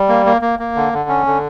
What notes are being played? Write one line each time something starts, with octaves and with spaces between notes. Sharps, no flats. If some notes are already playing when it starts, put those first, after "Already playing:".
Already playing: G3
A#3
A#3
A#3
A#3
D3
D3
C#4
D3